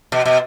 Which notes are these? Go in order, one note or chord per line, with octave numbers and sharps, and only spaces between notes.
B2
B2